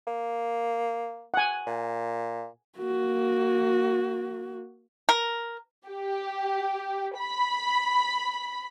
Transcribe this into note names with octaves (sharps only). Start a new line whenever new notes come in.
A#3
F#5 G#5
A#2
A#3 F#4
A#4
G4
B5